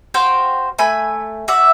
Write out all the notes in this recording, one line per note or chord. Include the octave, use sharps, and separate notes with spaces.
F#4 C5 F5 G5
A3 G#5 B5
F#4 D5 E5